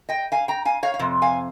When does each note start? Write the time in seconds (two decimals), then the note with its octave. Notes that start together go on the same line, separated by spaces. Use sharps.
0.09 D#5 G5
0.32 F5 G#5
0.48 G5 A#5
0.65 F5 G#5
0.83 C#5 F5
0.94 F5
0.99 F2 C3
1.22 F5 G#5